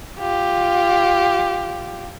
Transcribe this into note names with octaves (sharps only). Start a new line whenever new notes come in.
F4 G4